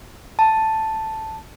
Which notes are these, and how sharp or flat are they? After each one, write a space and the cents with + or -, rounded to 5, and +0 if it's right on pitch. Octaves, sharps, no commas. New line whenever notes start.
A5 +0